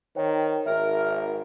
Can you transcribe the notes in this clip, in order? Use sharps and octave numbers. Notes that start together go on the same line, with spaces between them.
D#3 C5 C#5 G5
G#1 A#4 E5